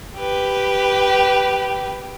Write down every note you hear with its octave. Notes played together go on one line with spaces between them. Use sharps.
G4 B4